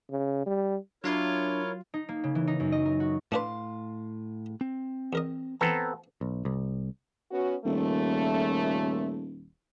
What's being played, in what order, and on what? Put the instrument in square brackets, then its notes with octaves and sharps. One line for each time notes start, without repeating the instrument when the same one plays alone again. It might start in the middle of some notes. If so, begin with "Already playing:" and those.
[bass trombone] C#3
G3
[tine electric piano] F#3 F5 C6 [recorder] D4 [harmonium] E4 A#4 C#5 [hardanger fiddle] F4
[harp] D#4
A#3
C#3
E3
D#4
F#2
D#5
A#4
F#4
[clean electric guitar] A2 F5 C6 [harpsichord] A3 D4 B4
[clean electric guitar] C4
[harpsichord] E2 A#4 D#5
[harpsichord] E3 [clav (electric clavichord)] B3 C4 A4 [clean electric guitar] A#5
[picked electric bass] B1
C2
[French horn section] B3 C#4 F#4
[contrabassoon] D#1 [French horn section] A#2 C#3 A3